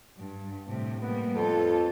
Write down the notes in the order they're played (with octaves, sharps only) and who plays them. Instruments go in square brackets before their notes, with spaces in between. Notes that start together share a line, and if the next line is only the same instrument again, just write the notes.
[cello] G2
A2 C3
[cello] G3 A#3 [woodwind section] B3
[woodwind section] F2 [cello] F4 A4